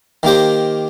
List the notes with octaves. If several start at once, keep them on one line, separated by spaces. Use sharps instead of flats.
D#3 A#3 G4 C5